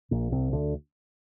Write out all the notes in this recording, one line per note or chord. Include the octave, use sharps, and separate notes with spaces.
A#1 A#2
C2 C3
D2 D3